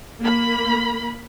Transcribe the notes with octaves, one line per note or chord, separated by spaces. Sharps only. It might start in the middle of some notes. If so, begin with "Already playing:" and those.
A#3 B5